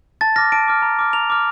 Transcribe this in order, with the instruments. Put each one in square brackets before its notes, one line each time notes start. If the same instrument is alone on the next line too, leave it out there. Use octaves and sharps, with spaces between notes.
[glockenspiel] A5 A6
D6 F6 A#6
A5 D7
D6 F6
A#5
D6 F6
A#5 F7
D6 F6